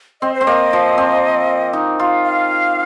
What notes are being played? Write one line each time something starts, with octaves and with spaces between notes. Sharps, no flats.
C4 D#5
C5
C4
A#3 D#5
F3
C4
D#4
F4
F5